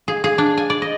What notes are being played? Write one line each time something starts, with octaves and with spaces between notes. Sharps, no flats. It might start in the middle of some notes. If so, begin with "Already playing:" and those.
G#4
G#4
D4
G#5
D5
D#5